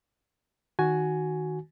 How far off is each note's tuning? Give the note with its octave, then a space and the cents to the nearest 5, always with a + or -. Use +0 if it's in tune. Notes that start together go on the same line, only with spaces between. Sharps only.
D#3 +0 F#4 +0 G#5 +10